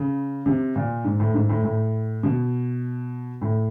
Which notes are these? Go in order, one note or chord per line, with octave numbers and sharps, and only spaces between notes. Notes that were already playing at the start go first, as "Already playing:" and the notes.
Already playing: C#3
C3
A#2
G#2
A2
G#2
A2
A2
B2
A2